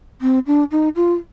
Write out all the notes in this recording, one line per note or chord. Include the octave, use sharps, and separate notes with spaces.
C4
D4
D#4
F4